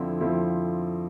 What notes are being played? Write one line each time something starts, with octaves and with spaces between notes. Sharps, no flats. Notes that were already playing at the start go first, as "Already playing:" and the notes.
Already playing: F2 D3 F3 C4 E4
F2 D3 F3 C4 E4